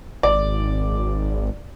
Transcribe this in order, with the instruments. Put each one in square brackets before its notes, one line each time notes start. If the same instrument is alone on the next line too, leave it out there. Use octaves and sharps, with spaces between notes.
[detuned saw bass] G#1 [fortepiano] D5